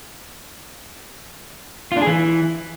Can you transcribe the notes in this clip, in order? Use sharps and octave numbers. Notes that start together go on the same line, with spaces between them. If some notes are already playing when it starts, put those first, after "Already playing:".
F4
D4
G#4
E3